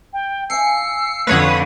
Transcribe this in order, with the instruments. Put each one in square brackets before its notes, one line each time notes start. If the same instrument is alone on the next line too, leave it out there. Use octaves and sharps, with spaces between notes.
[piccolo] G5
[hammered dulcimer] F5 G#5 A5 [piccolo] E6 [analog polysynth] C7 C#7
[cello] F2 D3 [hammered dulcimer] F4 [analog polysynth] B4 C#5 D#6